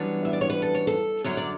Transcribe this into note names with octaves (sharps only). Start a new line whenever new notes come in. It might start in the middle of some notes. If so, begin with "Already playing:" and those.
Already playing: F#2 E3 G3 B3 D4 C#5
E5
D5
C#5
B4
A4
C#5
A4
F#2 D3 F#3 C#5
D5